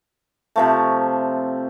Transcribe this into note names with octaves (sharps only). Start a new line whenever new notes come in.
C3 F3 A3